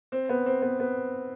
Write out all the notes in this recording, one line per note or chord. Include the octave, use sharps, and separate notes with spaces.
C4
B3
C4
B3
B3